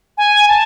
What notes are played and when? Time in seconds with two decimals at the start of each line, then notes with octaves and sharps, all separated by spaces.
0.18 G#5
0.48 A5